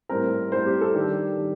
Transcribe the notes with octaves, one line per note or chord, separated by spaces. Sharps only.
A2 G3 C4 A#4
A2 G3 C4 C5
G4
A4
D#3 G3 D4 G4
D#3 G3